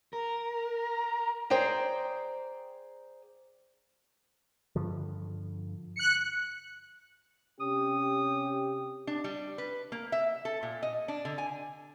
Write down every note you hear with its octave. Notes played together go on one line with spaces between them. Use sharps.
A#4
G#4 C5 D5 G5 A#5
G2 D3 F3
F#6 C#7
C3 C#4 G4 D#6
D4
G3
B4
A#3
E5
A4
A#2
D#5
D4
D3
G#5